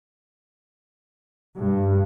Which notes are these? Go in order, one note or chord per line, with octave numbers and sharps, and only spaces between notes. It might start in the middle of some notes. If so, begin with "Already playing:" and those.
G2